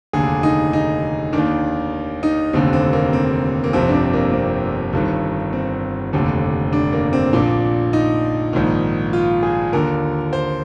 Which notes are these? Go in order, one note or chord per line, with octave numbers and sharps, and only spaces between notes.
F1 D#2 D3 G#4
D#4
D#4
D#2 D#3 D4
D#4
F1 D#2 D3 C4
C4
A#3
C4
A#3
G1 F2 C3 C4
D4
C4
A#3
C4
G1 G2 D#3
C4
F1 D#2 D3
D4
A#3
C4
A#1 A#2 D4
D#4
A#1 G#2 D#3
F4
G#4
D#2 D3 A#4
C5